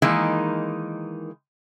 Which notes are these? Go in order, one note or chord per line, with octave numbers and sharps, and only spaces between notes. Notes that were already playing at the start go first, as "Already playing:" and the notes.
D#3 E3 G#3 A#3 D#4